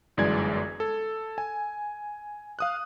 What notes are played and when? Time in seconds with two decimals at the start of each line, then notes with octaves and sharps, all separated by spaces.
0.17 G1 F#2 E3 G#3 D5 G#6
0.80 A4
1.38 G#5
2.59 F5 D#6 F#6